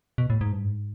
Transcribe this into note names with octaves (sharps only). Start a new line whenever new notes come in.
B2
A2
G#2
G2
G#2